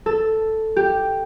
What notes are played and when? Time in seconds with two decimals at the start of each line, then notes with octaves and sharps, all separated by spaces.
0.06 A4
0.76 G4